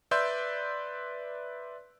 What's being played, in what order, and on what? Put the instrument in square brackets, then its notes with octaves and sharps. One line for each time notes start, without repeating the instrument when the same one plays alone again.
[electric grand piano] B4 D5 E5 C6 E6 G6